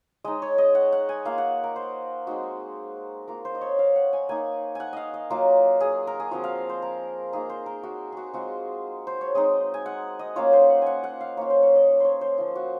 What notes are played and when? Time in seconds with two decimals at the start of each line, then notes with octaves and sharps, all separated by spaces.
0.24 G#3 D#4 D#5
0.42 C#5
0.58 D#5
0.75 F#5
0.92 F#5
1.09 G#5
1.25 A#3 F4 F5
1.38 F#5
1.64 A#4
1.76 C5
2.27 G#3 C4 D#4 F#4
3.28 A#3 F4 A#4
3.45 C5
3.55 D#5
3.61 C#5
3.79 F5
3.96 F#5
4.13 G#5
4.29 A#3 D#4 G#5
4.75 F#5 G#5
4.93 D#5 F5
5.14 D#5
5.30 F#3 A#3 F4 A#4
5.80 G#4
6.07 A#4
6.20 G#4
6.31 F3 C4 F4 F#4
6.44 F5
6.69 C5
6.82 A#4
7.33 A#3 D#4 G#4
7.49 C5
7.66 A#4
7.83 F#4
8.12 F#4 G#4
8.34 G#3 C4 F4 F#4
9.07 C5
9.21 C#5
9.35 G#3 C4 D#4 D#5
9.74 G#5
9.86 F#5
10.19 D#5
10.36 A#3 C#4 F4 C#5
10.53 C5
10.70 F#5
10.82 F#5 G#5
11.03 F#5
11.21 F5
11.37 A#3 C#4 F4 C#5
11.50 C5
11.63 C#5
11.75 D#5
11.88 C#5
12.00 C5 C#5
12.21 C5
12.38 F3 A#3 F4
12.55 F#4